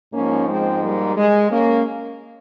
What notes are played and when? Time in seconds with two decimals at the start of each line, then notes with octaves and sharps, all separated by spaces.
0.12 G#2 F3 A#3 C#4
0.47 G#3 C4
0.81 G3 A#3
1.16 G#3
1.50 A#3 C#4